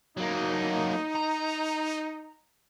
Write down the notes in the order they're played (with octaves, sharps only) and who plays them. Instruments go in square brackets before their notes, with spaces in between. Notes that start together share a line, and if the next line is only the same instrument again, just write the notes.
[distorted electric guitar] F#3 A#3 [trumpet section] D#4
[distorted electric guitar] A#5